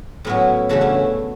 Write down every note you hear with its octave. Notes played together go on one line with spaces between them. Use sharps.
A2 F#3 B3 C#4 E4
C#3 E3 A3 D4 F#4
C#4 E4